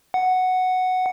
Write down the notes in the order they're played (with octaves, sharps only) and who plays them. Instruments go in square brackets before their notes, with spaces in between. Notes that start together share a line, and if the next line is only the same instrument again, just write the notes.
[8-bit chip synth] F#5